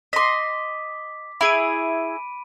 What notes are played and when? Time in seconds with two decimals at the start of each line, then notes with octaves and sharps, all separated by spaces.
0.13 D#5 C6 D6 B6
1.41 E4 G#4 B5 D7 D#7